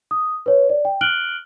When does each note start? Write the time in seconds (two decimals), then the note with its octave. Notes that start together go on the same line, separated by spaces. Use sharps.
0.11 D#6
0.46 B4 C#5
0.69 D5
0.85 G5
1.01 F6 F#6 D7 F#7 G7